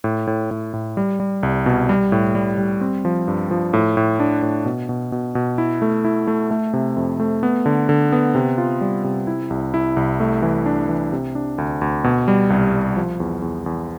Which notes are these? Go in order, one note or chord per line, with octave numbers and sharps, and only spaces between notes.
A2
A2
A2
A2
G3
G3
C2
B2
G3
A2
G3
G3
C4
F3
G2
F3
A2
A2
D4
A2
B2
B2
B2
B2
E4
A3
E4
A3
A3
C3
F2
A3
B3
D3
D3
B3
C3
F4
G3
C3
E4
C2
E4
C2
A3
E3
D4
E3
C3
D4
D2
D2
B2
G3
C2
G3
F3
E2
E2
E2